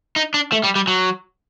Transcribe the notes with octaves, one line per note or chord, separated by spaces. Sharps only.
D#4
D4
A3
G3
G3
F#3